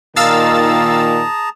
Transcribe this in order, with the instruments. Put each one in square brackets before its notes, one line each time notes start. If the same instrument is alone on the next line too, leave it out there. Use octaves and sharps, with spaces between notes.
[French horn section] A#2 D#3 [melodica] G#4 A5 A#5 [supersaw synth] F5 E6 A6